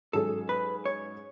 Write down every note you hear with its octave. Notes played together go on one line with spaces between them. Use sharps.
G#2 F#3 C#4 G#4 A4
B4
C#5